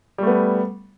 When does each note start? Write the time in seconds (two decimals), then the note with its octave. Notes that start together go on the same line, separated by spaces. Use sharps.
0.18 G3
0.23 A3
0.27 B3